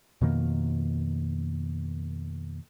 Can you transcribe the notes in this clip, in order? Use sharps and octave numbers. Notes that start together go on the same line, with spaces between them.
F2 B2 D#3 A#3